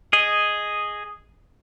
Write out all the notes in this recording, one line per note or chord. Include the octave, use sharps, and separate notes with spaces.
G#4 D#5